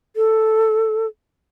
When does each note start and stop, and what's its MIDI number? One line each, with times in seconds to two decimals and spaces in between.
0.16 1.06 69